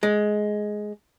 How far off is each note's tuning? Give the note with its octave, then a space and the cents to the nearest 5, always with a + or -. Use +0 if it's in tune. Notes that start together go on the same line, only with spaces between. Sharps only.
G#3 +10